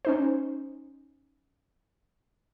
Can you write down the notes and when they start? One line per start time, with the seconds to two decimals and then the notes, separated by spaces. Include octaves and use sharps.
0.05 C#4 D#4 C5